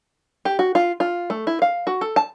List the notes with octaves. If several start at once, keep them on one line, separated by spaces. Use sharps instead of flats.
G4
F#4
F4
F4
A3
E4
F5
F#4
A4
A5